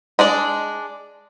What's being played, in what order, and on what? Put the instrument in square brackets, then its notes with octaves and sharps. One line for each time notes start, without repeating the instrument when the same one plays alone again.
[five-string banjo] G#3 D4 D5